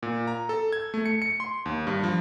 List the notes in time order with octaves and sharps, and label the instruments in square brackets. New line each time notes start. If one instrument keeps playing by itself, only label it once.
[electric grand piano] A#2
A#5
A4
G#6
A3
C#7
C#7
C6
D#2
G2
F3